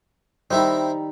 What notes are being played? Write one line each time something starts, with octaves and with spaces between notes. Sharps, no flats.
D#3 G3 C4 D#4 E4 E5